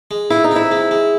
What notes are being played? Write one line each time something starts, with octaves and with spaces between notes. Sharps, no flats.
G#3
E4 F4
D#4
C4 E4
G#3
G#3